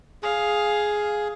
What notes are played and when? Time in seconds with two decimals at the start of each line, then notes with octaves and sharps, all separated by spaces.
0.23 G#4 F5